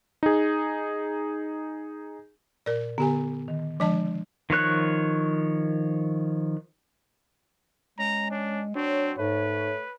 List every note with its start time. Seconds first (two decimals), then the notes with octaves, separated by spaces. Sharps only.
0.23 D#4 G#4
2.66 A#2 A#4 D5
2.98 D3 B3 G4 G#5
3.48 D#3
3.80 D3 F3 G#3 D4 D#5 A5
4.50 D#3 F3 C#5 F#6
7.99 G#3 C#4 A#5
8.31 C#4 D4
8.75 F#3 C4 D4 C#5
9.19 G#2 A3 B4